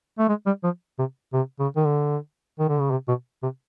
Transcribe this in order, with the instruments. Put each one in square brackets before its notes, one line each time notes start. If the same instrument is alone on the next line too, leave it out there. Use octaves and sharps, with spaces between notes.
[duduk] A3
G#3
G3
F3
C3
C3
C#3
D#3
D3
D#3
D3
C#3
C3
B2
C3